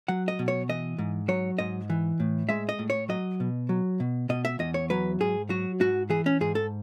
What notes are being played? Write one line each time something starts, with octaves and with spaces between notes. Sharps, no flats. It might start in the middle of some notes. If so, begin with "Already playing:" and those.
F#3 F#5
D#5
B2
C#5
E3 D#5
G#2
F#3 C#5
G#2 D#5
E3
A2
G#3 E5
D#5
A2
C#5
F#3 D#5
B2
F#3
B2
B2 D#5
E5
E2 D#5
C#5
F#3 B4
G#2 G#4
F#3 F#4
G#2 F#4
E3 G#4
C#4
G#2 G#4
A4